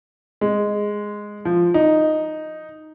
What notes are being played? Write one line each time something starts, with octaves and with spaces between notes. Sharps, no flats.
G#3
F3
D#4